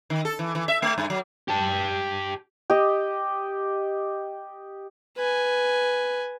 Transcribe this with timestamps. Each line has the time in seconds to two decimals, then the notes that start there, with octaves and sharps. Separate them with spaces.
0.10 D#3
0.25 A4
0.39 E3
0.55 E3
0.68 E5
0.82 A3
0.98 G2
1.10 F#3
1.48 G4 A5
2.70 G4 D#5
5.17 B4 G#5